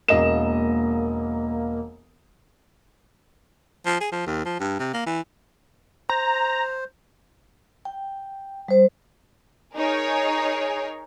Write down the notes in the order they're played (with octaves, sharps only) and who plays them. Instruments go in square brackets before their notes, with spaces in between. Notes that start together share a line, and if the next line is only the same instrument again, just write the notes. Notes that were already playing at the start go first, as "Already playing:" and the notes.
[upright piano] E1 D#5 E7 [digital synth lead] A#3
[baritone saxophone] F3
G#4
F3
D#2
F3
G2
C3
A#3
E3
[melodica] C5 [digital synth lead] A#5
[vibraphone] G5
G3 C5
[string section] D#4 G#4 A#4 C#5